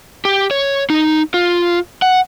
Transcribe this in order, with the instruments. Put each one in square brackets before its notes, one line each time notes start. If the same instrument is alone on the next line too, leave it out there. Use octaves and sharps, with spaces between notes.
[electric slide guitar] G4
C#5
D#4
F4
F#5